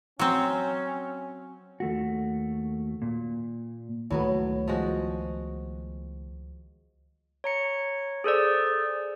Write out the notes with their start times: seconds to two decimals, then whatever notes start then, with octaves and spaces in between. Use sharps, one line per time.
0.19 F#3 C4 C#4
1.80 D#2 A3 F#4
3.02 A#2
4.10 C#2 A2 D#3 F#3 A3 B3
4.68 F3 G#3 F#4
7.44 C#5 A#5 C#7
8.24 G#4 A4 C5 D5